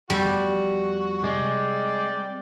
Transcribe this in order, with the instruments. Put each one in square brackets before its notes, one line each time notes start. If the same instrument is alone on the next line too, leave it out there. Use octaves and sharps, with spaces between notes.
[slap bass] F2 A3 B3 [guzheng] G3 [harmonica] F#4
[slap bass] C3 [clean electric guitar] G#3 [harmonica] D5 G5